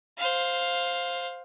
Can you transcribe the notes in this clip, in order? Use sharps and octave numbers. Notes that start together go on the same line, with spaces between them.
C5 F5